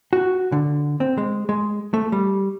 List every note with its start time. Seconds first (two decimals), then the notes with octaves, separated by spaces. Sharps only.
0.13 F#4
0.52 D3
1.00 C4
1.18 G#3
1.49 G#3
1.94 A3
2.12 G3